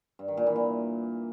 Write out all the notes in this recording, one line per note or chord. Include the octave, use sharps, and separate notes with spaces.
G2
D#3
A#2
E3
A#2